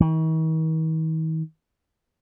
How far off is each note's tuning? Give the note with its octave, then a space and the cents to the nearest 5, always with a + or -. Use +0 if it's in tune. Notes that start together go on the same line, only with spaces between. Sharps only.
D#3 +45